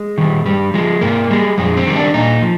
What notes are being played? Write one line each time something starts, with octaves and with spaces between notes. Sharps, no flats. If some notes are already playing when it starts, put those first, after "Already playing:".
Already playing: G#3
D#3 G3
G2 G3
F3 G#3
G#2 A#3
G3 G#3
F2 G#3
C4
D#3 G3
D4
A#2 D#4
F3